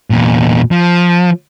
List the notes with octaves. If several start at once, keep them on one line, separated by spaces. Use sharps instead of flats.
E2 A#2
F3